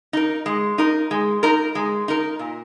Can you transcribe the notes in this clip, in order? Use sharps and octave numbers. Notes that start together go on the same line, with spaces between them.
D#4 A#4
G#3
D#4 A#4
G#3
D#4 A#4
G#3
D#4 A#4
A#2